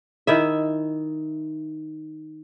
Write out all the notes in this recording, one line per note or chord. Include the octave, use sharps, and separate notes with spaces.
D#3 E4 E5